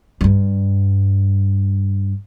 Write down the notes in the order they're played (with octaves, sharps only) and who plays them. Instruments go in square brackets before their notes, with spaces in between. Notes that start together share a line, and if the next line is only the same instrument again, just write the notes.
[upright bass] G2 G3